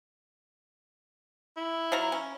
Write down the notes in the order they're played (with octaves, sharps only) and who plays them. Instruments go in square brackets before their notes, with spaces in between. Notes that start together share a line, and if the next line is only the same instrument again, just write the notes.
[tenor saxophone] E4
[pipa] F#3 F4 A#5
C#4